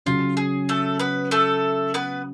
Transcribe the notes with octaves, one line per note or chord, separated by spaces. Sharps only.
C#3 F#3 C#4 F4
G#4
A3 A4
B3 B4
A3 A4
B3 B4